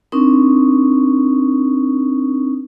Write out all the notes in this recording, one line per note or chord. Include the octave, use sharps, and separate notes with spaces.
C4 D4 D#4 A#4 C#6 D#6